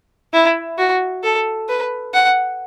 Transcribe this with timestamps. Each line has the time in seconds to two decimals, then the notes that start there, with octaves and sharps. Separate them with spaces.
0.33 E4
0.78 F#4
1.23 A4
1.69 B4
2.14 F#5